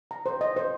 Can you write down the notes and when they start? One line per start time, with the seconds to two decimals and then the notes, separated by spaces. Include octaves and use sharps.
0.11 A#5
0.26 C5
0.41 D#5
0.56 C5